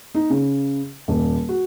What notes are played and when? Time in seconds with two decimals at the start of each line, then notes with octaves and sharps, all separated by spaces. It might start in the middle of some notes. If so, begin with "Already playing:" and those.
0.15 D#4
0.30 C#3
1.08 D#1
1.49 F#4